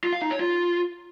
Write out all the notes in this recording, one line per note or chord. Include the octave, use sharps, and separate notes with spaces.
F4
F5
D#4
C#5
F4